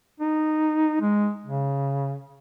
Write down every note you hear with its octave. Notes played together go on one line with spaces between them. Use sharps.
D#4
G#3
C#3